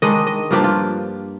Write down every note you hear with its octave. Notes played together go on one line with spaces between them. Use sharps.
D#3 G#3 D4 D#5
D#5
G2 F3 A#3 D4 G4
F4